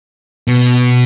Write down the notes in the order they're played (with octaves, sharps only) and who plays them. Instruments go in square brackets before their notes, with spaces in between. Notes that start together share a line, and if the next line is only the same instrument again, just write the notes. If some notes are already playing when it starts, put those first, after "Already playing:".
[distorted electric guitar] B2